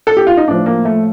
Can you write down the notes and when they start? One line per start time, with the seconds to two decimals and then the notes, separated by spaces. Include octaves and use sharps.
0.07 A4
0.17 G4
0.27 F4
0.37 D#4
0.48 A2 F3 D4
0.66 A#3
0.85 A3